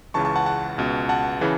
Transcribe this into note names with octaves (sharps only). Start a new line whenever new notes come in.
C#2 C#3 E3 A5 C#6
A5 C#6
F#5 A5
F#5 A5
C#2 B2
F#5 A5
C#3 E3